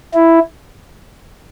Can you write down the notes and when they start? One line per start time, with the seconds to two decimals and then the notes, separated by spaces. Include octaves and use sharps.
0.14 E4